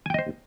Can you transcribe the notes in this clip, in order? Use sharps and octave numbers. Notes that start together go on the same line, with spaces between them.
C5 D#5 G5 G#5